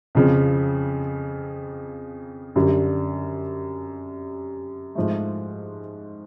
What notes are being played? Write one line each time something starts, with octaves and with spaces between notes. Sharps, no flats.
F2 C#3 F3
F#2 D3 G3
G#2 F3 A3